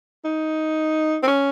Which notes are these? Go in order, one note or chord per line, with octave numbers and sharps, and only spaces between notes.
D#4
C4
C#4